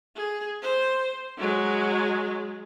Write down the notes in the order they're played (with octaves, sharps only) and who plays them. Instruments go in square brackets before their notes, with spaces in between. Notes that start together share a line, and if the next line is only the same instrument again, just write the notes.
[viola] G#4
C5
F#3 G#3